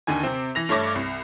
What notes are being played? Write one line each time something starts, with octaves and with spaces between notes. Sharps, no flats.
D#2 D3 D#3 G#5
C3 C4
E3 A#6 F7
G2 A3 C#5 D6 A#6
C2